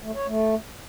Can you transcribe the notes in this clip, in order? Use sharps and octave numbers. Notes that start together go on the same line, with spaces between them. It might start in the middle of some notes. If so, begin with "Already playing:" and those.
A3
C#5
A3